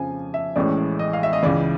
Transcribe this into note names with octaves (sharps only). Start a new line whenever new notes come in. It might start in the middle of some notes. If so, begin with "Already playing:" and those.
Already playing: F2 C#3 F3 G#5
E5
A1 A2 E3 G#3 C#4 D5
D#5
F5
E5
D#5
C#2 C#3 E3 D5